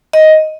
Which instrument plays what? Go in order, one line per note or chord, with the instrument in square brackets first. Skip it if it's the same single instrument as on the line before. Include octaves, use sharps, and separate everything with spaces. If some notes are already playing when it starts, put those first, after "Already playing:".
[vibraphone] D#5